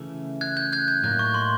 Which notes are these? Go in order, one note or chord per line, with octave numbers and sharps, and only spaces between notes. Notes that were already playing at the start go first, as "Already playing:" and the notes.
Already playing: C#3 E3 A3
F#6 G#6
G6
F#6 G#6
G6
A2 F#3 A#3 D#4 F#6
C#6
C6